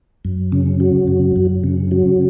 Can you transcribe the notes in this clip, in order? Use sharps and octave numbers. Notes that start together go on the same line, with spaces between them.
F#2
C#3
F#3
F#2
F#2
C#3
F#3